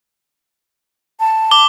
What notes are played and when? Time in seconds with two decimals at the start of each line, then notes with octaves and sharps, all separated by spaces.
1.20 A5
1.51 D6 G7